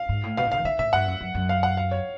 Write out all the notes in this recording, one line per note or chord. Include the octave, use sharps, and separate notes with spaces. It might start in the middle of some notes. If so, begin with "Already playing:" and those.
Already playing: F5
G#2
A2
B2 F5
A2
D#3 F5
D#3 E5
A2 E5
G2 F#5
F#2
F#2
F#2
F5
F#5
F5
C#5